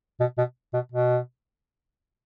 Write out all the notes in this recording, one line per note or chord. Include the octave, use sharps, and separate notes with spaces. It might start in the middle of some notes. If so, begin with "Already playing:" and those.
B2
B2
B2
B2